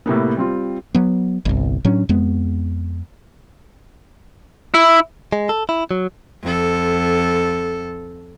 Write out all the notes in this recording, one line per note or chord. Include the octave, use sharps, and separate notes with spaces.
A2 C3 A#3 B3
G3 C4 F4
F#3 B3
G1 C2
A2 F#3 C#4 D4
F2 G#3 B3
E4
G#3
A4
E4
F#3
F2 A4